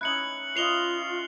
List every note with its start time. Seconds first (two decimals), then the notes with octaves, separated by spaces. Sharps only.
0.01 C#4 D#4 E4 F#6 C#7 F#7
0.56 F4 C#5 D#5 C7 F7 G7